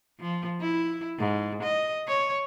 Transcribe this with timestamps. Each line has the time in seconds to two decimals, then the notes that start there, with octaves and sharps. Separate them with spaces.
0.20 F3
0.61 E4
1.18 G#2
1.63 D#5
2.07 C#5